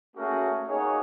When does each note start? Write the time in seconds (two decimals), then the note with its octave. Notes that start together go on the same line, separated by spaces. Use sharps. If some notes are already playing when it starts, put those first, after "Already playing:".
0.17 A3 A#3 C#4 F#4 G#4 A#4
0.68 A#3 D#4 F#4 G#4 C#5 D#5